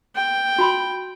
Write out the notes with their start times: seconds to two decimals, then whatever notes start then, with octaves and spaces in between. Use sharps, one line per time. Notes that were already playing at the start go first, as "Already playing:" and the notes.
0.15 G5
0.59 F#4 B5 C6